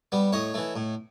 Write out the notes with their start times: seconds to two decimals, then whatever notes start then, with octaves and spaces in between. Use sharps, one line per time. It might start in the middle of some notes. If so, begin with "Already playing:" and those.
0.12 G3 B3
0.32 A2 C#5 D#5
0.54 E3 A3
0.76 A2